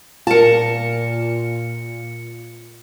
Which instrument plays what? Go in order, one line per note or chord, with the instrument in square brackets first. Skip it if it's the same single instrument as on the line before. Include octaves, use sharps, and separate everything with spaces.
[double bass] A#2 [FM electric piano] F4 C#7 [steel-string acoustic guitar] A#4 A5